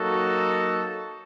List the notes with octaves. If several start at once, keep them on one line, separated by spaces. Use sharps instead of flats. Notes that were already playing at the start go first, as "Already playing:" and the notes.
Already playing: F#3 A#3 D#4 F#4 A4